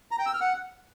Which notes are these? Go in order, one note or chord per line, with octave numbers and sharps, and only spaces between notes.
A#5
G5
E6
F6
F#5